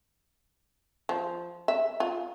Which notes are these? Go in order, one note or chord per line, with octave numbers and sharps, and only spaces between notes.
F3
E5
F4